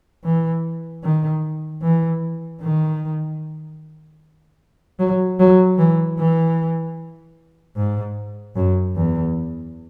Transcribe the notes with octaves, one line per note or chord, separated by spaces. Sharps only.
E3
D#3
E3
D#3
F#3
F#3
E3
E3
G#2
F#2
E2